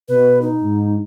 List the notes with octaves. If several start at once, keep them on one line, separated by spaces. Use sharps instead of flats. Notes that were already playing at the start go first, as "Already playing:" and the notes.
B2 B4
D#4
G#2